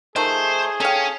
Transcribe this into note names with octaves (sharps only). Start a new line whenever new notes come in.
D#3 F3 A3 G#4 C5
C#4 A4 F5 G5